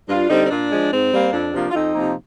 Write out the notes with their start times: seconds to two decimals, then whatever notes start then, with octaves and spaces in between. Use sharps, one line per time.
0.08 G2 D4 F4
0.29 D3 G3 C4 D#4
0.45 C4
0.50 A#2 D4
0.70 F3 G#3
0.92 G#2 C4
1.12 G3 A#3
1.33 F2 D4
1.54 C3 F3 A#3
1.70 F4
1.74 F2 C4 D#4
1.95 C3 F3 A#3